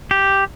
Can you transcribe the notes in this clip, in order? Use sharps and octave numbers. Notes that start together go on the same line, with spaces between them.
G4